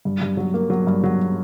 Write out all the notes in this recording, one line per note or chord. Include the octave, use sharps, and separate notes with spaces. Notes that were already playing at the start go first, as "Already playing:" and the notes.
G2
G2
F#3
A#3
F#3
G2
F#3